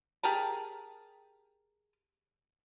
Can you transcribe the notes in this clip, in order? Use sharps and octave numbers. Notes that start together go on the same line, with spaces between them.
G4 G#4 A#4 A5